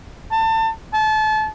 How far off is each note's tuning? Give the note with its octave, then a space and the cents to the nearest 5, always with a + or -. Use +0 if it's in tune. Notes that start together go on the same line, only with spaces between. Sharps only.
A5 +30
A5 -30